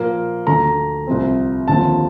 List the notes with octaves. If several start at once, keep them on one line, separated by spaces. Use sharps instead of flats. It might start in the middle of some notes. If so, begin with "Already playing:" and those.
Already playing: A#2 F3 A#3
D2 D3 A3 A#5
C2 C3 F3 C4
D#2 D3 F3 C4 A5